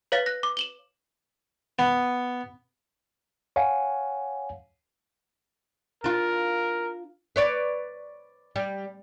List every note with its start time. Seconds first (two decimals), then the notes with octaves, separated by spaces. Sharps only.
0.12 B4 C#5 F5 A6 B6
0.26 F#6 A#6
0.43 D6
0.57 E7 F#7 G7
1.79 B3
3.56 C#5 F5 F#5 G#5
6.04 D4 F4 A#4
7.36 B4 C#5 D5
8.56 G3